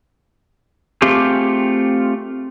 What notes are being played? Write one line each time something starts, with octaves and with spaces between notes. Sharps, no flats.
A3 C4 F4 G4 G#4